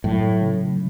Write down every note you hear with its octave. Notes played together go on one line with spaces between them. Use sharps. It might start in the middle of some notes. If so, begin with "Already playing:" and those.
A2 F#3
C#3